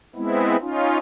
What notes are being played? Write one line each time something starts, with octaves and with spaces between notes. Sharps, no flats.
G#3 B3 C4 E4
C#4 D#4 F4